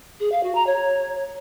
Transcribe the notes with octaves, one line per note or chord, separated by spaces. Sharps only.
G#4
F5
F#4
A#5
C#5